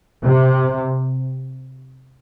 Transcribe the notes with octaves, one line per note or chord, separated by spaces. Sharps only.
C3